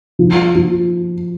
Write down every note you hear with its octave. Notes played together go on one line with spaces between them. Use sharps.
F3
F3